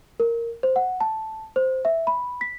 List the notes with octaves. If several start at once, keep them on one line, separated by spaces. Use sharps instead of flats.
A#4
C5
F#5
A5
C5
E5
B5
B6